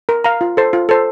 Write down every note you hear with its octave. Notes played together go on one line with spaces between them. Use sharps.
A#4
F5 A#5
F4
A4 C5
F4
A4 C5